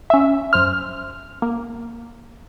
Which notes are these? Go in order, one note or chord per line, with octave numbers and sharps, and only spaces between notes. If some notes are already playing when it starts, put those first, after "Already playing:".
C#4 E5
F#2 C5 F6
A#3